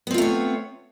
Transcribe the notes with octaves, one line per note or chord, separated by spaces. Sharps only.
A3 B3 C4 F4 C#5